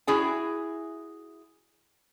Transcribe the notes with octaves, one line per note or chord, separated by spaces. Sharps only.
E4 F#4 G#4 G#5